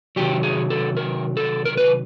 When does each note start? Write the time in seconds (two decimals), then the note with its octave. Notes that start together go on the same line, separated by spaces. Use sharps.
0.16 C3 D#3 F#3 G4
0.43 G#4
0.70 A4
0.97 A#4
1.37 A4
1.65 A#4
1.77 B4